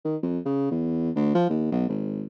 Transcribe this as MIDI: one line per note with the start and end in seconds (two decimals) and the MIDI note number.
0.05 0.16 51
0.23 0.39 41
0.45 0.71 49
0.71 1.10 40
1.16 1.31 38
1.35 1.46 53
1.49 1.68 39
1.72 1.88 35
1.88 2.26 32